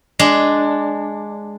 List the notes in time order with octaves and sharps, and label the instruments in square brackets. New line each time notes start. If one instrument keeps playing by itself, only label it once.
[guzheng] G#3 D4